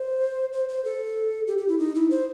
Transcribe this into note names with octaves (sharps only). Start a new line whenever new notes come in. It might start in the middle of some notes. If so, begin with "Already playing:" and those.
Already playing: C5
C5
C5
A4
G4
G4
E4
D#4
E4
C5